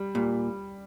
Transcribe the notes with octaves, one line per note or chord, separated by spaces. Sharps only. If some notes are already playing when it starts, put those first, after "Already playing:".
Already playing: G3
A#2 G3